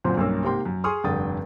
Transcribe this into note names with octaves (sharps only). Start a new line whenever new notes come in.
F#2 A#2 D3 C4 C5 C6
B1 G2 A#3 C#4 E6
G#2 C3 A#3 G5 C6
F#2
G#4 C6 C#6 D#6 F6
F1 G2 D3 G5 D#6 A6